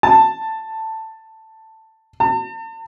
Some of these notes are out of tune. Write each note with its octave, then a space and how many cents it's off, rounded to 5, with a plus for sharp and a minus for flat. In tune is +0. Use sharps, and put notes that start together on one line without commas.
A5 +10
A5 +45